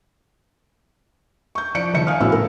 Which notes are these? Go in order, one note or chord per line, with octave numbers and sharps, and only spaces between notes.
C#6 G6
F3 D5 C#7 D7
F#1 D#3 D#4 E5 C#7
F5 G#5 D#6 F6
A#1 A2 B3 F#4 F5 E6
A#4